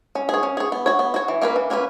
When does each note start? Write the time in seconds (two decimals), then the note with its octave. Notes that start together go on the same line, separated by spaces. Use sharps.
0.15 C#4
0.29 G#4 C#5
0.43 C#4
0.57 G#4 C#5
0.72 B3
0.86 F#4 C#5
0.99 B3
1.14 F#4 C#5
1.28 E3
1.42 A#3 C#4 F#4 B4
1.56 E3
1.70 A#3 C#4 F#4 B4